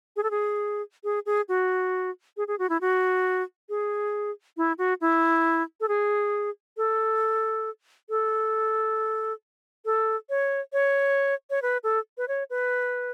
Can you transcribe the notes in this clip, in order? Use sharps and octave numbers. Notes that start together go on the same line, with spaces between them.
G#4
A4
G#4
G#4
G#4
F#4
G#4
G#4
F#4
E4
F#4
G#4
E4
F#4
E4
A4
G#4
A4
A4
A4
C#5
C#5
C#5
B4
A4
B4
C#5
B4